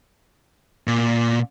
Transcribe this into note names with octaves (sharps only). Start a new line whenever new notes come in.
A#2